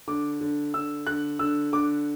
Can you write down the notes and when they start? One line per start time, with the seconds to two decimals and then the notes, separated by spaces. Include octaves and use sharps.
0.07 D3 D6
0.41 D3
0.74 D3 E6
1.07 D3 F#6
1.39 D3 E6
1.72 D3 D6